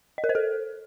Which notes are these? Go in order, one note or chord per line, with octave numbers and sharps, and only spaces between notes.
D#5
A#4
C5
A4